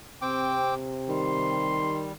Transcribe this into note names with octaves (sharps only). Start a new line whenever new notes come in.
C3 C4 G5 D6
D#3 G3 C6